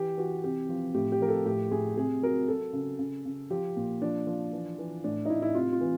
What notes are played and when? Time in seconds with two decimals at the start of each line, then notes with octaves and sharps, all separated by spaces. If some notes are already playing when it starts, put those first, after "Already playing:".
Already playing: E3 G4
0.17 E3 F#4
0.44 C3 G4
0.69 F3
0.94 A2 G4
1.12 G4
1.20 F3 A#4
1.29 A4
1.46 A2 G4
1.71 A2 G#4
1.97 C3 G#4
2.23 F#3 A#4
2.48 F#3 A4
2.73 C#3
2.99 C#3
3.25 C#3
3.50 F3 G4
3.76 A#2
4.02 F3 D4
4.27 F3
4.53 E3
4.79 E3
5.04 A2 D4
5.25 D#4
5.30 A2 E4
5.42 E4
5.55 C3 F4
5.72 F4
5.81 E3